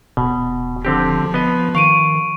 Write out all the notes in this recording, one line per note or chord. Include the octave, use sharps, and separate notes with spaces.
D#1 B2
D3 F3 C4 G4
B3 D#5
D#3 F5 C#6 D7 D#7